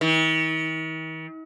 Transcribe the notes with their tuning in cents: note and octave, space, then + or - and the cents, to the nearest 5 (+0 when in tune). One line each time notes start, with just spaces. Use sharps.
D#3 +45